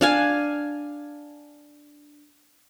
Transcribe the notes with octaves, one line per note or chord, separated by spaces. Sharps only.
D4 F5 G#5